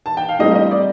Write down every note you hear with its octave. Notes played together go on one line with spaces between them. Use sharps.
A5
G5
F5
A2 G3 C4 D#4 D#5
D#5
D5